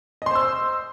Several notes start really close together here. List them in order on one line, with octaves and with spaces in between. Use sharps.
D#5 C6 C5 E6